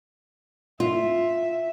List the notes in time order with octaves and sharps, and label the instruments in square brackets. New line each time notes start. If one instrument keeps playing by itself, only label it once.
[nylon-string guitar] F4 [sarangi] E5